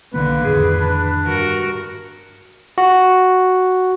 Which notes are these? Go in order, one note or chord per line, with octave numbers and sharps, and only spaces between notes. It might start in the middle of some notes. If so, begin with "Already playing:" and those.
B1 D3 D#3 A#3 B3 B4
F2 A2 D#3 G#4
D4
G2 F#4 A#4
F#4